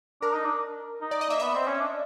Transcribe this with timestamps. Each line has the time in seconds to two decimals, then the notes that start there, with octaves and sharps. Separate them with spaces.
0.21 D4 A#4
0.34 D#4
0.45 D4
1.01 D#4
1.11 D5
1.21 D#5
1.29 A#3 E5
1.40 B3 E5
1.55 C4
1.67 C#4
1.80 D4